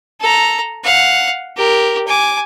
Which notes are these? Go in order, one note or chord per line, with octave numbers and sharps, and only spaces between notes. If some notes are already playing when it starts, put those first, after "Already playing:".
A4 A#5
F5 F#5
G4 A#4
G#5 D6